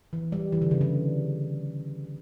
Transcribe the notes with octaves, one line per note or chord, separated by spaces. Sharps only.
E3
G3
E3
D3
C#3
D3